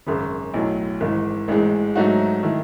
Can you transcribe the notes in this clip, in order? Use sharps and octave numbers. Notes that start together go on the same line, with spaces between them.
G#1 F#2 C#3
B1 A2 F#3
G#1 G#2 E3
A1 G#2 E3 G#3
G#2 F#3 A3 D#4 F#4
D#3 A3 E4